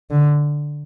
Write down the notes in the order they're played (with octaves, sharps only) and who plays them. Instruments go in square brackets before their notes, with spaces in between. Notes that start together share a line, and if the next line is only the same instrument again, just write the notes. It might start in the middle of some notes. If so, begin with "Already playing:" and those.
[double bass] D3